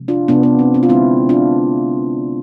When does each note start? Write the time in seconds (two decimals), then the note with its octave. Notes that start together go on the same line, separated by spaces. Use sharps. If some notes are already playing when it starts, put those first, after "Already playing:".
Already playing: C3 F3 G#3
0.08 D4 F4
0.28 C3 F3 G#3 B3 D4
0.43 B3
0.59 C4
0.74 C4
0.83 F4
0.89 D3 G#3 C4 E4
1.29 D4 F4